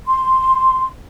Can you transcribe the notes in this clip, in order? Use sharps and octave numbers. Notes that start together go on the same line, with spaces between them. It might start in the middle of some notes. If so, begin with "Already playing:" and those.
C6